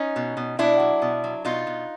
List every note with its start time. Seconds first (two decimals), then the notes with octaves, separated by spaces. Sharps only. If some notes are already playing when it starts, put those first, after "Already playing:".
Already playing: C#4 D#4
0.16 B2
0.37 B2
0.59 B2 D4 E4
0.80 F#3
1.02 B2
1.24 F#3
1.45 B2 D#4 F4
1.67 B2